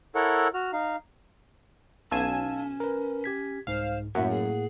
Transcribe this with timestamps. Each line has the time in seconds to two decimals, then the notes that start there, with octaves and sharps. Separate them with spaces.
0.15 E4 A4 A#4 C#5 F#5
0.54 F#4 F6
0.73 D#4 F5
2.11 B1 C#4 F5 G#5 A5 E6 E7
2.80 A#4 B4
3.24 G4 G#6 B6
3.67 C2 G#2 C5 F5
4.15 F#2 A2 A#3 E5 F#5
4.30 G#4